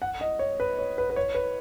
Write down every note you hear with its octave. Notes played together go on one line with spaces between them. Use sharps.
F#5
D#5
C#5
B4
C#5
B4
B4
C#5
B4